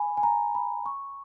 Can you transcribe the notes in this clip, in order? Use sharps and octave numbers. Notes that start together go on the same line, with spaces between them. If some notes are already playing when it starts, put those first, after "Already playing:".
Already playing: G#5 B5
G#5
A#5
B5
C#6